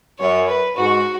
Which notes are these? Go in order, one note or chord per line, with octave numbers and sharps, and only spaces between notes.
F#2 C#5
B4
G#2 F#4